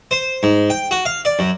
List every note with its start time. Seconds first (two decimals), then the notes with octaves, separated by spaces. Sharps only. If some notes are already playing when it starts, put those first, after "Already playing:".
0.11 C5
0.43 G#2
0.70 G5
0.91 F#4
1.05 F5
1.25 D5
1.39 F#2